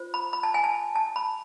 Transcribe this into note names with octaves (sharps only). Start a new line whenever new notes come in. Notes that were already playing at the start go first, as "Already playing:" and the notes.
Already playing: F4 C5
B5
B5
A5
G#5
A5
A5
B5